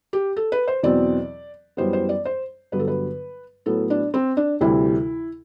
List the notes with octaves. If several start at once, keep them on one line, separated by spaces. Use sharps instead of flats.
G4
A4
B4
C5
E2 B2 F#3 C4 D5
F#2 E3 G3 B3 C5
C5
D5
C5
G2 D3 F#3 B3 B4
A4
B4
A2 F#3 B3 A4
D4
C4
D4
D2 C3 E3 G3 E4